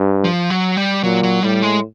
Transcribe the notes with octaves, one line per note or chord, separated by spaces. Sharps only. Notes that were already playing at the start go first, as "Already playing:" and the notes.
Already playing: G2
F3
F#3
G3
A#2 F#3
F#3
A2 G3
G#3